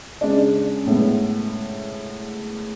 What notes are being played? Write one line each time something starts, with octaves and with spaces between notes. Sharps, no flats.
C#3 G#3 D4
A2 G#3 B3